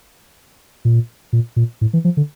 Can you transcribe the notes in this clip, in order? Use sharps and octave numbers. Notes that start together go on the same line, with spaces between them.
A#2
A#2
A#2
A2
E3
F3
D3